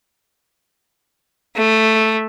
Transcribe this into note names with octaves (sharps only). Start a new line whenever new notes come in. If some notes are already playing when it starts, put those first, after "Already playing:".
A3